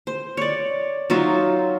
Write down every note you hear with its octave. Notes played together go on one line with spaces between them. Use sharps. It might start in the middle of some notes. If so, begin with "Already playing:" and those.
C5
C#5 D5
F#3 D#4 F4 E5